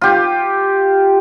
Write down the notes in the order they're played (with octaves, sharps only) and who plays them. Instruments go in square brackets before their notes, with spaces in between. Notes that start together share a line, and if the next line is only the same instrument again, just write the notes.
[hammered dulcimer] F4 G4